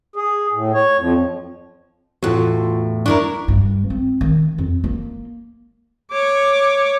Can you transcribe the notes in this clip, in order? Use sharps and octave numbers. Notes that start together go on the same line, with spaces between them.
G#4
A2
C#5
F2
E2 A2 F4 F#4
D4 E4 A#4 C#6
G2
C4
D#3
F2
A#3
C#5 D6